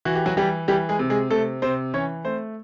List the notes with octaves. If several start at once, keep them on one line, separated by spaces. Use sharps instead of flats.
E3 F#4
G4
F#3 F#4
E3 G3 G4
E3 G3 G4
G#3 G#4
C3
G#3 G#4
C3 A3 A4
C3 C4 C5
E3 C#4 C#5
A3 C4 C5